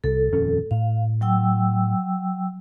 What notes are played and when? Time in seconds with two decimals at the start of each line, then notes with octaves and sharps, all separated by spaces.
0.04 C2 A4
0.32 D#1 F2 C#4
0.71 A2 F5
1.21 F#3 G5 E6